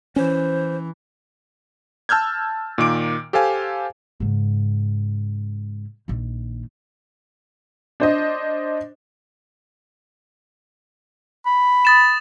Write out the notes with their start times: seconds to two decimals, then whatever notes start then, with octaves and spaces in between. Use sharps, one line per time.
0.16 E3 C#4 C5
2.09 A5 E6 F6 G6 G#6
2.78 A#2 D#3 D6 D7
3.33 G4 A4 C5 F5 G#5
4.20 G#2 C#3
6.08 A#1 D#3
8.00 D4 C5 D#5
11.46 B5
11.85 D#6 A6 E7